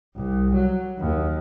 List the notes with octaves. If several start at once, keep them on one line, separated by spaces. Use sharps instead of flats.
C2
F#3
D#2